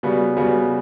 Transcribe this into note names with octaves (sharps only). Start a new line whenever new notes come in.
C#3 G3 B3 F#4
C#3 G3 B3 F#4